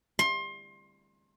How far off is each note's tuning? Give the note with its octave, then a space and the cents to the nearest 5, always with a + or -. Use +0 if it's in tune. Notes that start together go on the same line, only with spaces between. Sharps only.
C6 +30